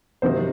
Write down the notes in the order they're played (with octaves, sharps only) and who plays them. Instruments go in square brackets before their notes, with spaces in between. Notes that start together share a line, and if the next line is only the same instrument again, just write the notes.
[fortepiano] C3 D#3 F#3 A#3 C5